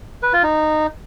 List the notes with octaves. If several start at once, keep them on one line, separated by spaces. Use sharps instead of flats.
B4
F4
D#4